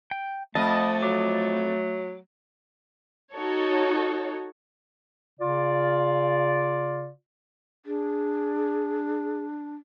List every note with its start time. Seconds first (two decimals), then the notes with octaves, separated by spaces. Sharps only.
0.11 G5
0.55 F2 A3 D#5 A5
1.03 F#3 D6
3.35 D#4 F#4 A4 C#5
5.40 C#3 F4 D5
7.86 D4 G#4